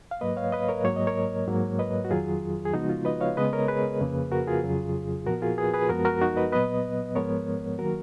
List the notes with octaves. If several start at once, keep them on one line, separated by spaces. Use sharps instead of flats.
F5
G#2 F#3 A#3 B4 D#5
C#5 F5
B4 D#5
A#4 C#5
G#2 F#3 A#3 C#5
D#5
A#4 C#5
G#2 F#3 A#3
B4 D#5
F#4
F2 D#3 F#3 F4 G#4
G#4
C#3 F3 G#3 B3 D#4 F#4
F4
B4 D#5
C#5 F5
C#3 G#3 B3 B4 D#5
A#4 C#5
G#4 B4
F2 C#3 F3 A#3
F#4 A#4
F4 G#4
F2 C#3 F#3
A#2 F3 B3 F#4 A#4
F4 G#4
G#4 B4
G#4 B4
F#2 F3 G#3 B3 F#4 A#4
F#4 A#4
D#4 F#4
B4 D#5
A#2 F#3 B3 B4 D#5
G#2 F3 G#3 B3 A#4 C#5
D#3 F#3 A#3 F#4 A#4